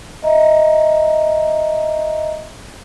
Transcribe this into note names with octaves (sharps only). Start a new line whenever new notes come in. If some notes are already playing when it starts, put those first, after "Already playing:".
D#5 E5 A#5